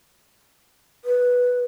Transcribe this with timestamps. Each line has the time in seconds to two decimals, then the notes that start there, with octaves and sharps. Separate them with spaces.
1.05 B4